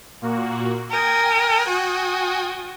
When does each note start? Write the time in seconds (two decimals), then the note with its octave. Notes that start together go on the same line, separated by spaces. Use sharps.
0.22 A#2 A#3 F#4
0.91 A#4 G5 G#5 D#6
1.68 F#4